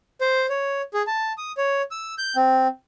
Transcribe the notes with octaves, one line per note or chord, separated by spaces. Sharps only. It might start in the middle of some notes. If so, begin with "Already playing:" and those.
C5
C#5
G#4
A5
D#6
C#5
E6
G6
C4